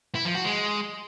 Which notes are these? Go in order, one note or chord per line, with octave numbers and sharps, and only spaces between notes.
E4
F3
F#4
G#3